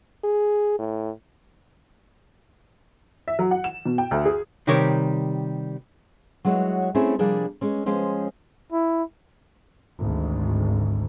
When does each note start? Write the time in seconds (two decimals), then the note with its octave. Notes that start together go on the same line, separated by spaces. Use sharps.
0.24 G#4
0.79 A2
3.28 E5
3.39 F#3
3.51 F#5
3.64 E7
3.85 B2
3.98 G5
4.11 D2
4.25 G#4
4.67 C3 D#3 G3 G4 A#4 C#5
6.45 F#3 G#3 E4 F#4 C#5
6.95 A3 C4 C#4 E4 G#4 A4
7.19 C3 F3 G3 A#3 D4 G#4
7.61 G#3 C#4
7.86 F3 G#3 C#4 C5
8.72 E4
9.99 G#1 D2